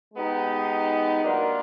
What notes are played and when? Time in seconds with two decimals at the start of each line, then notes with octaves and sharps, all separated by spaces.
0.14 G#3 B3 D#4 G4
1.23 F#3 A#3 D4 F4 A#4